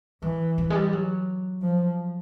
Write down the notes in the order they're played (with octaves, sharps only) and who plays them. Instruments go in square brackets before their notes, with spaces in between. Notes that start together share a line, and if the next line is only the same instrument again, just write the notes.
[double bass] E3 [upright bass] F#3
[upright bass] F3
G#3
G3
F#3
[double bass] F3